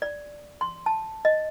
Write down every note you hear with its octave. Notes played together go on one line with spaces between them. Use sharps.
D5
C6
A5
D#5